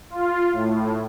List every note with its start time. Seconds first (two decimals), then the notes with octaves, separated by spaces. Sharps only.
0.10 F4
0.53 A2